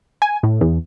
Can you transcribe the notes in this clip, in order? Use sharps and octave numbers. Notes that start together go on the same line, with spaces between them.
G#5
A2
E2